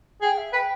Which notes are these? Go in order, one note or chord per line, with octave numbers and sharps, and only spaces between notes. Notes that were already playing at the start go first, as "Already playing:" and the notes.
G#4 G5
E5
B4 G5